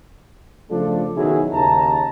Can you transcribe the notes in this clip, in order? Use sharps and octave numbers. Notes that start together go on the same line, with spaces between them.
C#3 F3 A3 D4 F4 A4
B2 D#3 F#3 E4 G#4
D#2 C#3 A5 A#5